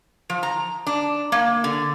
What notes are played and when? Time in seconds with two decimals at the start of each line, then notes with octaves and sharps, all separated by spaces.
0.30 F3
0.43 A#5
0.87 D4
1.32 A#3
1.64 D3